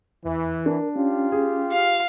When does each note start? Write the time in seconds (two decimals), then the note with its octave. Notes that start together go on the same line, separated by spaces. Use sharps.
0.25 E2 E3
0.66 D4 A#4
0.96 C#4 F4 G4
1.32 G#4
1.73 F5